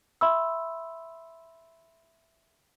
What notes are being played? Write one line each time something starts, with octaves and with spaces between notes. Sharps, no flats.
E5 B5 C6 E6